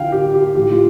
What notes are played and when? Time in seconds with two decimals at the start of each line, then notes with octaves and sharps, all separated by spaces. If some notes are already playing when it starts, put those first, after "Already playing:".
Already playing: D3 F3 F5 G5
0.12 G4
0.34 G4
0.55 A2 F3 A3 G4
0.71 F4